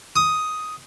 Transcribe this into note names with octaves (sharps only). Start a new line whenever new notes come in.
D#6